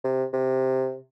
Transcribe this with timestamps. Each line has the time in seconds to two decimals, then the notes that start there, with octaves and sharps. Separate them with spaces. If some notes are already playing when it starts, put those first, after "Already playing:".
0.04 C3
0.34 C3